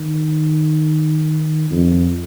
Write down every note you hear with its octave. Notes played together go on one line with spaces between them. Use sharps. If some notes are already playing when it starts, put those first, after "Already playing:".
Already playing: D#3
F2